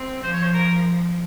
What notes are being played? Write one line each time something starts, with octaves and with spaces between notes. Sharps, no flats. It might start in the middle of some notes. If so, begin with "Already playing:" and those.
Already playing: C4
F3 C5
C#5
C5
A#4